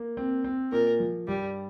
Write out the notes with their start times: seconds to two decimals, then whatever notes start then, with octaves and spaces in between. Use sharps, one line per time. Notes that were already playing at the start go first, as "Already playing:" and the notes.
Already playing: A#3
0.17 C4
0.44 C4
0.72 A#2 A#4
1.00 F3
1.28 G2 G3